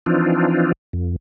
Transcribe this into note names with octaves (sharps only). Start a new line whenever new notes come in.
E3 F3 C4 D4 D#4 F4
F2